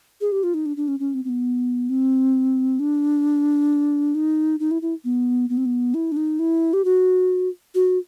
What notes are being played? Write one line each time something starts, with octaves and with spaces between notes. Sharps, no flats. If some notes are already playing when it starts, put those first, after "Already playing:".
G#4
G4
F4
D#4
D4
D4
C#4
C#4
C4
C4
B3
C4
D4
D#4
D#4
E4
E4
B3
B3
C4
B3
E4
D4
D#4
E4
G4
F#4
F#4